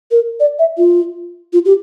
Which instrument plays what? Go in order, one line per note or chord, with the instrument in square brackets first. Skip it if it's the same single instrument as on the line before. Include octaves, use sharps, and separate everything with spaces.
[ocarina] A#4
D5
E5
F4
F4
G4